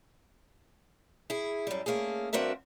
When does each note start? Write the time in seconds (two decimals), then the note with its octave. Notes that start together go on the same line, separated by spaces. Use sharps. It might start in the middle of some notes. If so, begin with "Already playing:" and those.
1.30 E4 G#4
1.67 F#2 G3
1.86 A3 A#3 C#4 G#4
2.33 G2 C4 D4 F#4 A#4 E5